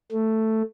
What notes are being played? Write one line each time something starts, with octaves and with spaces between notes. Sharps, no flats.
A3